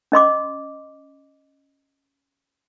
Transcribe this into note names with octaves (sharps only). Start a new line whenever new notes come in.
C#4 D#5 C6 D6